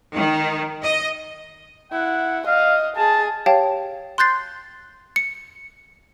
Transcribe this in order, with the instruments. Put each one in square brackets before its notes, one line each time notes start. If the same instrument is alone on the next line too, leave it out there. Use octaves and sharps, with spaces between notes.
[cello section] D#3
D#5
[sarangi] E4 [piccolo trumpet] F#5
[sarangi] D#5 [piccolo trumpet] F5
[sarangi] G#4 [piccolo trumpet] A5
[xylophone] G4 C#5 F5 G5 A5
C6 F#6 G6 A6 C7
C#7